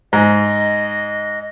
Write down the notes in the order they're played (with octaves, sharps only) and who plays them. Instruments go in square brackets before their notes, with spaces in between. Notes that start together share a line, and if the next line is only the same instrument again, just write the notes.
[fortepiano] G#2 [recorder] D#5